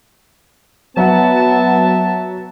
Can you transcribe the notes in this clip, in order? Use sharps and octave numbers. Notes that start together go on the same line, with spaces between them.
F#3 B3 E5 F#5 A5